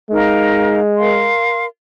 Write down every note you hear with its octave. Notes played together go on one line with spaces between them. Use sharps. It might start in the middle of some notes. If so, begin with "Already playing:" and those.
G#3 D#4 A#4 F5
A#4 F5 C6